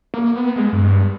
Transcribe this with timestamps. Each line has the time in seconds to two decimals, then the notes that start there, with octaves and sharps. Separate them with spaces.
0.14 A#3
0.35 B3
0.56 G#3
0.73 G2